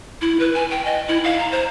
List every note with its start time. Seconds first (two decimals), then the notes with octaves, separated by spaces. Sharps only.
0.21 E4
0.39 B4
0.54 G#5
0.70 G5
0.85 D#5
1.08 E4
1.24 F5
1.39 A#5
1.51 C5